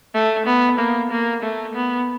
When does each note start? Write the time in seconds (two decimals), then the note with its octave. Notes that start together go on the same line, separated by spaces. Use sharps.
0.14 A3
0.46 B3
0.78 A#3
1.11 A#3
1.43 A3
1.75 B3